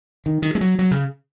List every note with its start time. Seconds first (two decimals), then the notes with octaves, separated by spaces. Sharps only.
0.26 D#3
0.42 D#3
0.55 G#3
0.61 F#3
0.79 F#3
0.91 C#3